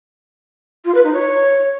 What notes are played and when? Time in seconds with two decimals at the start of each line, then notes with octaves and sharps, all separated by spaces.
0.85 F4
0.95 B4
1.04 D#4
1.13 C#5